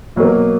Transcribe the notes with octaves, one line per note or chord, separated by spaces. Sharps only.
B2 F#3 A#3